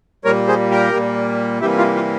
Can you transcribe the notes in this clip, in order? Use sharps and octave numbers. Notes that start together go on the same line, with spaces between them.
A#2 G3 A#3 A#4 C#5
G#4 C5
G4 A#4
A#2 G3 A#3
C3 E3 G3 A#3 E4 G4
F4
F4